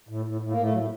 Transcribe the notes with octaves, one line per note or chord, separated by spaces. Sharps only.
A2
A2
A2
A#3
A2 A3
A2 F#3